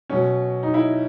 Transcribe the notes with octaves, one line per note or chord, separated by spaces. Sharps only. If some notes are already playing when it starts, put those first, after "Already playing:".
B2 F#3 C#4
D#4
E4